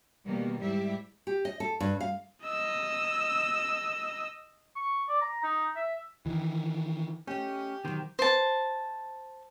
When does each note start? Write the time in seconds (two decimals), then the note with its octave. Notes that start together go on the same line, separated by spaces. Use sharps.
0.25 B2 D#3 G3 A#3
0.59 G#2 G3 E4 G4 E5
1.27 G4
1.45 D#5
1.60 A4
1.80 G2
2.01 F5
2.44 D#5 E6
4.76 C#6
5.08 D5
5.21 A#5
5.43 D#4
5.76 E5
6.26 D#3 E3
7.27 A3 C#4 G4 D#5
7.85 B2 D#3 F#3 G4 C5
8.19 C5 A5